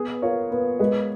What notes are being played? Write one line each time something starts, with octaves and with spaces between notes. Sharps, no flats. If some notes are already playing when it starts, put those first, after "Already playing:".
Already playing: B3 G#4 B4
F4 A#4 C#5
B3
G#3 B4 D#5